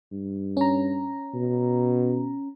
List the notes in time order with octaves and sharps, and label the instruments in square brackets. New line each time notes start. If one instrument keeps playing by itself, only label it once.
[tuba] G2
[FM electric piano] C#4 A#5
[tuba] B2